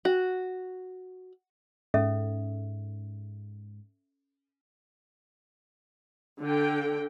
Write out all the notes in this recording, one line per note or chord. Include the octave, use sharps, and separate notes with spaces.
F#4
G#2 C#4 A4 E5
D3 G5